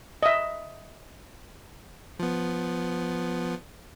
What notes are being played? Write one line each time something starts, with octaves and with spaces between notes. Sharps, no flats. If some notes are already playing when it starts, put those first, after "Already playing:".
D#5 E5
F3 B3